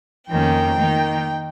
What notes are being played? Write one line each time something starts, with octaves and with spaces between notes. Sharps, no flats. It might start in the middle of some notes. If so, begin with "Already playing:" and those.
F2 D#3 A#3 C#4 G5
D#3 A#3 D#4